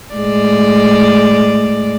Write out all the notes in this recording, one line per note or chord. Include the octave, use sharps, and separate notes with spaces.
A2 G#3 D5